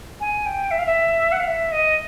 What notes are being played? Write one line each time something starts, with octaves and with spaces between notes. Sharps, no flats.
G#5
G5
E5
F5
E5
F#5
F5
E5
D#5